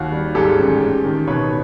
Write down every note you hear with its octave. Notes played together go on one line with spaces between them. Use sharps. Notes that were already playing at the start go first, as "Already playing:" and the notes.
Already playing: D#2 F#4
G3
G#2 G4 A4
A1
A1
D#3
B2 B4 C#5